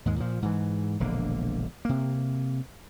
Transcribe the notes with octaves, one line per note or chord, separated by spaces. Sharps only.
D#2 G#2 G#3
A#2 F3
G#2 E3
E1 A#1 D3 A#3
C3 A#3